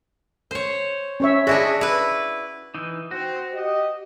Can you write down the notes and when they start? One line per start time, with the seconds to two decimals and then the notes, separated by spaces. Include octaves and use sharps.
0.51 C5 C#5
1.20 C#4 C#5 E5
1.47 D4 E4 F#4 G#4 D#5 E5
1.81 E4 B4
2.75 E3 D#4
3.11 C4 F#4
3.53 G4 D#5